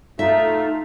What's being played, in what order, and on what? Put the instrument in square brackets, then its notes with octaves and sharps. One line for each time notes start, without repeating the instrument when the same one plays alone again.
[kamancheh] A3 [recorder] D#4 [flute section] F4 A4 [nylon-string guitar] E5